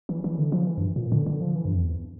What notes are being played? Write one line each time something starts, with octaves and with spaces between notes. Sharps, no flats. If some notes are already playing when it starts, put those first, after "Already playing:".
E3
E3
D3
F3
E3
G2
A#2
D3
D3
F3
E3
G2
F2
E2